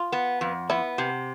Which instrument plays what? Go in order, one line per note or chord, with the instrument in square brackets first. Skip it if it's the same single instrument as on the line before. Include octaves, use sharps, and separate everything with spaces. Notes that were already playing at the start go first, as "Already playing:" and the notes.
Already playing: [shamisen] F4
[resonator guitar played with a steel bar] B3
F2
[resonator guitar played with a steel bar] B3 [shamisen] E4
[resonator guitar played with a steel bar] C3